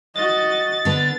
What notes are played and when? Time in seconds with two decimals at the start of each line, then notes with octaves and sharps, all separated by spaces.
0.16 F#4 D#5 A6
0.85 D3 B3